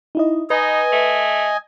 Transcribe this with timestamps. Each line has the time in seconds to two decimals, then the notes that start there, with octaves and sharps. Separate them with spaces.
0.15 D#4 E4 D#5
0.50 D#4 B4 D#5 G#5
0.92 A3